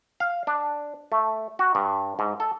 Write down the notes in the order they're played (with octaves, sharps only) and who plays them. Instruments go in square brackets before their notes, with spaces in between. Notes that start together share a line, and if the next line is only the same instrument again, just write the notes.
[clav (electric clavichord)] F5
D4
A3
F#4
G2
G#2
A4